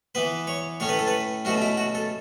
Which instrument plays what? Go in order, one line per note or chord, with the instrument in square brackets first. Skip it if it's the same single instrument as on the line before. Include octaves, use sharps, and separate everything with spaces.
[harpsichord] E3 B3 B4
C#5
A2 A3 C#4 C#5
B4
A4
B4
B2 A3 C#4 F#4
E4
F#4
A4